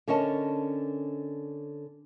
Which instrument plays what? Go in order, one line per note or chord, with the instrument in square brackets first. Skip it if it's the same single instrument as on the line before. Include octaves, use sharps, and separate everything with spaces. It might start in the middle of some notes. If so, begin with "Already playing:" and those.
[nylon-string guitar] D3 C#4 A#4 C#5 D#5 A5